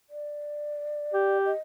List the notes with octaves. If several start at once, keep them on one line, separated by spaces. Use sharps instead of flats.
D5
G4
D#5